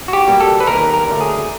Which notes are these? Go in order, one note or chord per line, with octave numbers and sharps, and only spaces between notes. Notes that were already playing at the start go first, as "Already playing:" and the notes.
F#4
G4
B2 G3 A#3
A4
B4
D#2 A#4
A#4
D3 F#3 A3
G#4